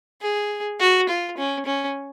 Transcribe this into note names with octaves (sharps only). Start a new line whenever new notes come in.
G#4
F#4
F4
C#4
C#4